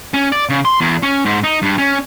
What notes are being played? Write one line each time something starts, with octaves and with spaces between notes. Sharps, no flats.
C#4
D5
C#3
C6
E2
C#4
G#2
D#4
G2
C#4